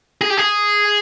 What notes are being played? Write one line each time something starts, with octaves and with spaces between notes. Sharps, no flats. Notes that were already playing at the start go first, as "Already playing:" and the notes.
G#4
G4
G#4